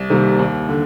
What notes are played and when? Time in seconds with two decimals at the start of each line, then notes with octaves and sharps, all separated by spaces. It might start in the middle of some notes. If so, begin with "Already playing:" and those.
Already playing: C2
0.10 C3 D#3 G3 A#3
0.39 D#2
0.69 D3